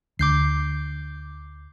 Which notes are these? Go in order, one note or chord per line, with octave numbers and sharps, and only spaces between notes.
D2 D6 G6 C7